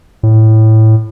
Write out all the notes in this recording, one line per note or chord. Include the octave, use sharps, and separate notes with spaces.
A2